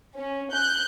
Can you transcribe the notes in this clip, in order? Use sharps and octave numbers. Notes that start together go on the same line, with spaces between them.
C#4
F#6 G6